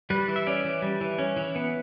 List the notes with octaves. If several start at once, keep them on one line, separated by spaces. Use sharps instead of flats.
G3 B4
E3
E5
C#4 D5
E3
G3
E3
C#4
E3
B3